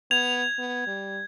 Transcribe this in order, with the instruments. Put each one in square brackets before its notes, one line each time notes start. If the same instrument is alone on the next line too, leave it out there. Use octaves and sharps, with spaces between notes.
[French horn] B3 [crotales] G#6 [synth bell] F7
[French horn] B3
G3